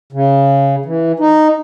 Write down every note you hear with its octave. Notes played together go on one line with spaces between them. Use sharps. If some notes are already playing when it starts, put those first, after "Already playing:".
C#3
E3
D#4